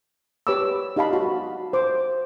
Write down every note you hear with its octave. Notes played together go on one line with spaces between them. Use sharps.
G4 B4 C#5 B5 D6 E6
D#4 G4 D#5 F5 A5 B5
F#4
C5 D6